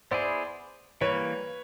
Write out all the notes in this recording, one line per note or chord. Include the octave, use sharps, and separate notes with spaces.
B3 E4 G#4 C5 D5
E3 G3 A#3 B4 C#5